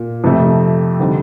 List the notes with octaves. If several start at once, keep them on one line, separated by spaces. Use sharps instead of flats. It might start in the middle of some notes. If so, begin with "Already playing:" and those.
Already playing: A#2
F2 C3 F3 A3
D3 G3 C4 D#4